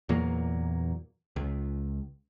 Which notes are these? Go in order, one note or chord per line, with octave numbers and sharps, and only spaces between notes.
E2 A#2 F#3 A#3
C#2